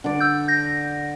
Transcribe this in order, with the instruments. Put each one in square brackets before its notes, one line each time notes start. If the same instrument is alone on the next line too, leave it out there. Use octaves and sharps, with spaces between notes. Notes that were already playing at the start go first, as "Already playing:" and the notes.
[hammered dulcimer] D3 D5
[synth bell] E6 G6
G6 A#6